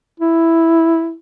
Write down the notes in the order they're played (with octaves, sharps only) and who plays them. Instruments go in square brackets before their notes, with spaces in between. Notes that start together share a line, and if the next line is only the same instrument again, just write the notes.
[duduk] E4